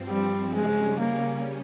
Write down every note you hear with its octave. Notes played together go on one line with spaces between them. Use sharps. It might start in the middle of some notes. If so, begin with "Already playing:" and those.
Already playing: G2 F3 C4
G3
C#3 G3 G#3 C#4
A#3